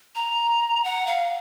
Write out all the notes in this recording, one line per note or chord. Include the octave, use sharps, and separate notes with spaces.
A#5
F#5
F5